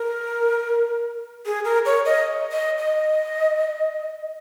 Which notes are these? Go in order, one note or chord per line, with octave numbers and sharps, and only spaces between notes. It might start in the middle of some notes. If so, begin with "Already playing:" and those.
Already playing: A#4
G#4
A#4
C#5
D#5
D#5
D#5